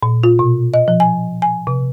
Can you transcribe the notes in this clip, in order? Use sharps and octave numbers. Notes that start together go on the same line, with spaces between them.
A#2
F4
B2
D#5
F3
G#5
G#5
C3